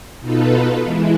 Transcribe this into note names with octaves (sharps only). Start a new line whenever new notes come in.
B2 D#4 F4 A4 B4
E3 G#3 E4